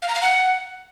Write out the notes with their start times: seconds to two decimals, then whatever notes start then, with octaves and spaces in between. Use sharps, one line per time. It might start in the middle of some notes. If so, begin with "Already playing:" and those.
0.02 F5
0.09 A#5
0.15 F5
0.21 F#5